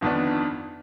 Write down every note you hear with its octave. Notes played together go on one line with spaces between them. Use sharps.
G1 F2 D#3 B3 D4